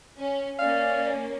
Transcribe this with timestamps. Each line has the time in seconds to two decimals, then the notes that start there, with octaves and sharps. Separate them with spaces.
0.18 C#4
0.59 A#3 C#4 D5 F5